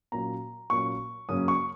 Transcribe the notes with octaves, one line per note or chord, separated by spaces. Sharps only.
A#2 F#3 A#3 C#4 A#5
A#2 F#3 A#3 C#4 C#6
F#2 C#3 F#3 A#3 C#4 D#6
C#6